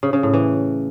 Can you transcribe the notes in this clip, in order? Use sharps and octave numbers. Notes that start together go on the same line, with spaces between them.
C#3
C#3
A2
E3